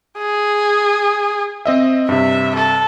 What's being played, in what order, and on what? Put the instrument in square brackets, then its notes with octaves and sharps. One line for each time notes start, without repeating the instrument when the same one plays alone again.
[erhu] G#4
[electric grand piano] C4 D#5 E5
[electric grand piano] G2 C3 [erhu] E5
[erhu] A4